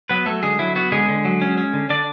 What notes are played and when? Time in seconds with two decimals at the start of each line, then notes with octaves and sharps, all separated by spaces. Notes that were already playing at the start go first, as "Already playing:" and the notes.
0.09 F#3 B3 B4
0.26 F#3 A3 A4
0.43 D3 G#3 G#4
0.59 F#3 E4
0.75 B3 F#4
0.92 D3 G#3 G#4
1.08 D3
1.25 F#3
1.42 C#4
1.58 C#4
1.73 D3
1.89 D3 D4 D5